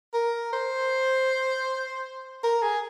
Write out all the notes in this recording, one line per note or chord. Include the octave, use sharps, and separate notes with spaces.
A#4
C5
A#4
G#4